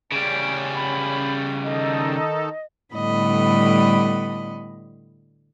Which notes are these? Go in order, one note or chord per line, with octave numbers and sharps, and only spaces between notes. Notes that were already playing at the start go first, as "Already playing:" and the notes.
C#3 G3 C#4 D7
B5
D#3 D#4 A4 D#5
A2 D3 G3 B3 D#5 B5